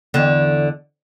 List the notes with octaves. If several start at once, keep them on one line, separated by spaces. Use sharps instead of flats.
E2 D3